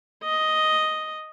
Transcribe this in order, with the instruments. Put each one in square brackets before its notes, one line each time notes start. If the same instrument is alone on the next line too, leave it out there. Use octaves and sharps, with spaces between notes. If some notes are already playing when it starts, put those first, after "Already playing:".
[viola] D#5